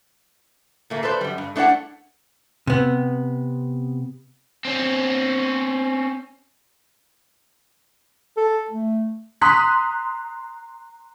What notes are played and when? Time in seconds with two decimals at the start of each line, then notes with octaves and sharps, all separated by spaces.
0.90 A#2 A3 A#3
1.03 A4 B4 C5 D5
1.21 F#2 G3
1.38 G2
1.56 A3 D4 E4 C5 F#5
2.67 C3 B3
4.65 C4 C#4
8.37 A4
8.70 A3
9.42 A#5 C6 D#6 F#6 B6